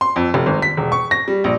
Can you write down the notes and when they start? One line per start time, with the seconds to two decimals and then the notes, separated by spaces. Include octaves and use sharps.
0.01 C6
0.16 F2
0.34 F1
0.46 G#1
0.62 B6
0.77 E1
0.92 C#6
1.11 A#6
1.28 G3
1.44 A#1